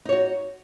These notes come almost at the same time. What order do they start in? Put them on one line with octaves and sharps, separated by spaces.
D#4 C#5 F#4